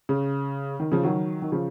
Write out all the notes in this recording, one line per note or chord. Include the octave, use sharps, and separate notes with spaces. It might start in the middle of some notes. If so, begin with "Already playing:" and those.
C#3
D#3
C#3 F3
D#3 F#3
D#3
C#3 F3